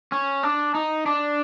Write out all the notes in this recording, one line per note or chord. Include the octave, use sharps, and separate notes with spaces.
C#4
D4
D#4
D4